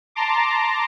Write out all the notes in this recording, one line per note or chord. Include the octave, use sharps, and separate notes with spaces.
A5 A#5 C6 D6